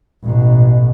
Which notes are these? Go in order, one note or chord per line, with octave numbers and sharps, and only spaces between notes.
A1 B2